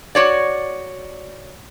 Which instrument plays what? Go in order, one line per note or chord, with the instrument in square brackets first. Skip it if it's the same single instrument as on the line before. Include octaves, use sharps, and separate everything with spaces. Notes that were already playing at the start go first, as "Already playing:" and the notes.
[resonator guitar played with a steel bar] F#4 C#5 D5